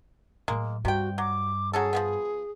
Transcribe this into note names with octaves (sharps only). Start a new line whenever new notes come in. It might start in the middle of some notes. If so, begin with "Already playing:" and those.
A2 F#3 G#3 A#3
G2 C3 F#4 G5
F#3 D6
F#3 C#4 G#4 A4
F3 G3 B3